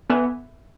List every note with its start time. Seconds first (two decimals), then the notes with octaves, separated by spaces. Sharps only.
0.10 E3 B3